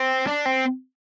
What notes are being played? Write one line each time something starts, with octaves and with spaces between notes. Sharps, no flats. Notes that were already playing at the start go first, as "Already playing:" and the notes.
Already playing: C4
D4
C4